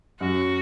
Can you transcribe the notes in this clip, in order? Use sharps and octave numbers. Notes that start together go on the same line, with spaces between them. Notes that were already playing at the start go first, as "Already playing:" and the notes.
F#2 F#3 F#4